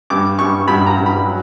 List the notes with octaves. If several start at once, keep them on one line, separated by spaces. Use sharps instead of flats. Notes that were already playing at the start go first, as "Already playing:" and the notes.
G2 D6
G2 C#6
G2 B5
A#5
G2
B5
F#3